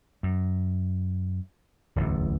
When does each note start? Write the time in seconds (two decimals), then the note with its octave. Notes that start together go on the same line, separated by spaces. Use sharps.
0.23 F#2
1.96 D1 A1 E2